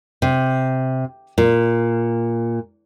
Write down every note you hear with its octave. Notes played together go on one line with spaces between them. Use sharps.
C3
A#2